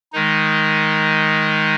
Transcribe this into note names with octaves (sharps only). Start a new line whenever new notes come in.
D#3 G#3 D#4